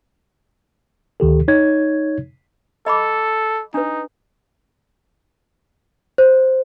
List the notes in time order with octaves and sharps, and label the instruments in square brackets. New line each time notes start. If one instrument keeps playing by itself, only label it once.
[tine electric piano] D2 D#3 G4 A4
D#4 C#5 G#6
[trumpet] A4 [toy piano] D#5 B5 D6
[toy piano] D4 B4 [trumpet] D#4
[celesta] C5